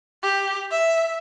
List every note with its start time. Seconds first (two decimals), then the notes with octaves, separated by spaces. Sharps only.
0.23 G4
0.72 E5